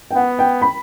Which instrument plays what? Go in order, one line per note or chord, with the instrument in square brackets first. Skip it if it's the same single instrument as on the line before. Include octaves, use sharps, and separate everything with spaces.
[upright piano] G5
[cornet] B3 [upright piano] F#5
[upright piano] G5
B5